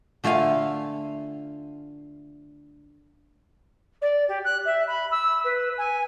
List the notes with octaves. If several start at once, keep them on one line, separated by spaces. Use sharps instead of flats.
D3 A3 F4 F5 G#5
D5
G4
F#6
E5
B5
E6
B4
G#5